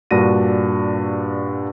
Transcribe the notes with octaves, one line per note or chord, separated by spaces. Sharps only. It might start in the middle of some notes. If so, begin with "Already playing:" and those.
G2 A#2 D4 F#4 A#6 D#7